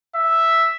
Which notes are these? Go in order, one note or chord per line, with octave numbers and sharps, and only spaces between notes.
E5